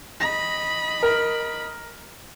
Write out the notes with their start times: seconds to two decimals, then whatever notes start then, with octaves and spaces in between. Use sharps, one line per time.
0.21 D#5 B5 A#6
1.03 A#4